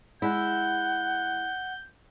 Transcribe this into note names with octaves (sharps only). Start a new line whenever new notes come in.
G#3 E4 F#5 G6